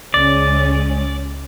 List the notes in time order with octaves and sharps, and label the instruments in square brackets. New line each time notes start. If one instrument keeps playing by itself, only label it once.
[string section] C#2 G#3 C#4 [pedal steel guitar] D5